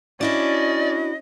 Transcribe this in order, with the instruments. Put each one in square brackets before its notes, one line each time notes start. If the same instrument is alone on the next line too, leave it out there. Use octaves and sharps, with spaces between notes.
[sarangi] C#4 [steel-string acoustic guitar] D4 E4 F#4 [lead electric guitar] D5 [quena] D#5